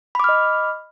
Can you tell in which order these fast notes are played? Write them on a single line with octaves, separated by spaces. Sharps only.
B5 D6 F6 D#5